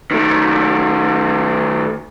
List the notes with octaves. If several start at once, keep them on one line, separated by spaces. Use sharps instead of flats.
D#3 A3